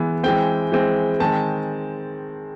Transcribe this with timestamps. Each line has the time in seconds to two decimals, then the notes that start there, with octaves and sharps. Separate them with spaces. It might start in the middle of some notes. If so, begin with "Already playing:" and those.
Already playing: E3 G#3 B3
0.23 E3 G#3 C4 G5
0.72 E3 G#3 C4
1.20 D#3 G#3 C4 A5